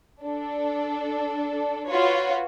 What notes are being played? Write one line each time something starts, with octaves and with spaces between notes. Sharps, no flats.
D4 A4
F4 F#4 B4 C#5